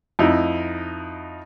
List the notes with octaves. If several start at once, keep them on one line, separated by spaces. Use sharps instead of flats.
F2 D#4 E4